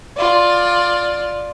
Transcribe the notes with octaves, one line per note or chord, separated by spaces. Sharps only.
F4 D5